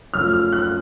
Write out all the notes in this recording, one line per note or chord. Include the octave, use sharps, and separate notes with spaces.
F#2 F3 A3 F6
F6
F#6